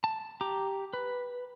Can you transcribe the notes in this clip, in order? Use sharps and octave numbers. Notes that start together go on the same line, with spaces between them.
A5
G4 A#5 D6
B4